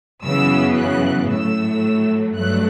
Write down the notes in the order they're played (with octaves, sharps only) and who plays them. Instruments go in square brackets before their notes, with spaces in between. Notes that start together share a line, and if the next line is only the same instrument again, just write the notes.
[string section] F#2 C#3 E3 B3 E6
F#6
A2 F#3 A3 E6
G2 F#3 A3 F#6